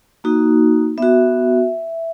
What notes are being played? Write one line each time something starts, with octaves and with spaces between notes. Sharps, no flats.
A#3 D#4 F#4
B3 F#4 E5